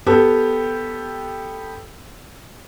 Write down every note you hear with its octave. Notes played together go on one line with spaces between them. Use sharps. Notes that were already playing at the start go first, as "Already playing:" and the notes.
B3 G4 A4